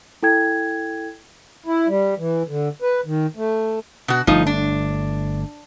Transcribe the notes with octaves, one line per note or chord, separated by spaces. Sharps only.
E4 A4 G5 G#6
E4
G3
E3
D3
B4
D#3
A3
B2 F#4
G1 F3 A3 D#4
D4